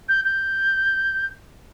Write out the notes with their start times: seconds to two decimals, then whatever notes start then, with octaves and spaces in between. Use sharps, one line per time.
0.09 G6
0.25 G6